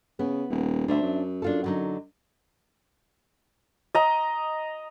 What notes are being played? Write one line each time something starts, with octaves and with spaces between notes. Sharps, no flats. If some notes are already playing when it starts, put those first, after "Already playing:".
C#3 B3
D#1
D2 D4 C5 E5
F#2
D4 F4 A4
D3 F#3 D#4
D#5 A#5